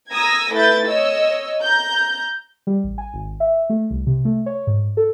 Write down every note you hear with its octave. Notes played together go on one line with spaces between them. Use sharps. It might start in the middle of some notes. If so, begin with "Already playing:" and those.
A#5 D#6 E6 G#6 A#6
A3 E4 B4 G6 A6
C#5 D#5 E6
A#5 G6
G3
A1
G#5
G#1
E5
A3
C2
C3
A3
C#5
G#2
A4